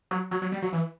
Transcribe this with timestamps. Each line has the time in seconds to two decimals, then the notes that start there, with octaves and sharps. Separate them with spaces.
0.11 F#3
0.31 F#3
0.42 F#3
0.52 G3
0.62 F#3
0.73 E3